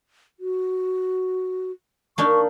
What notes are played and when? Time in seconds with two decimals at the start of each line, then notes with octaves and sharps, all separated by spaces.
0.40 F#4
2.18 A#3 D4 D#4 C#6